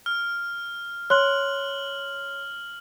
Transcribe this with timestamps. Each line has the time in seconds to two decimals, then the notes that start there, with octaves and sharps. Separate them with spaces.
0.06 F6
1.10 C#5 C6 F6 F#6 F#7